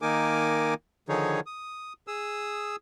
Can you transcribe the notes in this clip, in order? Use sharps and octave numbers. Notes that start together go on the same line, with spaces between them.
D#3 A#3 D#4 A#4 G#5 D6
D3 D#3 F3 D#4 G#4 C#5
D#6
G#4 D#6 E6